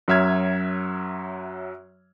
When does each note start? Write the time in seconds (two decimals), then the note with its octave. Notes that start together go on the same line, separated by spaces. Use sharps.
0.08 F#2 F#3 E5 F6 G#6